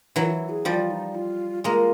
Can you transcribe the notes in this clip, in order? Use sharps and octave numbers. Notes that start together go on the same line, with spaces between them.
E3 F#3 F4
E4
G#4
F3 G3 F4
D#4
F4
G#3 A#3 F4